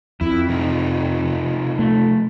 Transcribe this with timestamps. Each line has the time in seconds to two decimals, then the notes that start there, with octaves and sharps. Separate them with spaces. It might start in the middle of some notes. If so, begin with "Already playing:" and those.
0.21 F2 E4
0.49 C3 F3 D#4
1.79 A3